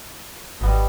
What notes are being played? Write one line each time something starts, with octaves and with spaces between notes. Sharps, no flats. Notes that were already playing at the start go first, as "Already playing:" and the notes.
G#1 G3 B3 D#5